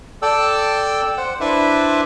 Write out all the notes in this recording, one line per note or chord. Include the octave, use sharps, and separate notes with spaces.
A4 D5 G5 A5 E6
C5 F#5
D4 E4 B4 C5 D5 E5